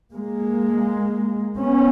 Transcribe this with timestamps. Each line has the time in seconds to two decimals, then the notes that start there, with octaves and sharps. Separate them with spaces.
0.13 G#3 A#3
1.58 B3 C#4